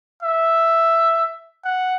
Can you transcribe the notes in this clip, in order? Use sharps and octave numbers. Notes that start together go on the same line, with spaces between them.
E5
F#5